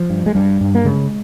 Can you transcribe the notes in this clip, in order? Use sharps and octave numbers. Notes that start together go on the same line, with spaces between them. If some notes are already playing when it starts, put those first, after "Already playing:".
Already playing: F3
G2
G#3
G2 G3
G2
A#3
C#3 G#3